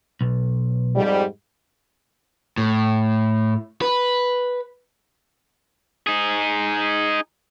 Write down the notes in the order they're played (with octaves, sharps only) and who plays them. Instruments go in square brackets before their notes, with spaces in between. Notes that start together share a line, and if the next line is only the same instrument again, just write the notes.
[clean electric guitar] B1
[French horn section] F2 G#2 G3
[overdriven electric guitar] A2
B4
[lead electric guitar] D#4 G#4